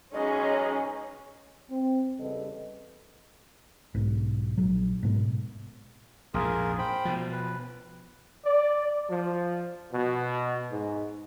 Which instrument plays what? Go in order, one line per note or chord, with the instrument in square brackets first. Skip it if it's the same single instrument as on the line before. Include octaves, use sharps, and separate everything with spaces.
[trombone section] B1 G#3 D#4 [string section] C#4 G#4 [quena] D#5
[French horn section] C4
E2 C#3 G3 A4 B4 D#5
[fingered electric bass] B1 G#2
A#1 F#3
G#2 B2
[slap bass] A#1 F2 G#2 [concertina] F4 G#4 A#4
[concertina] C5 G5 B5
[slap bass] B2 F3
[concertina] B4
[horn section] D5
F3
B2
G#2